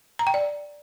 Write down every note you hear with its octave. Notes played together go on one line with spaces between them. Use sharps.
A#5
G5
D5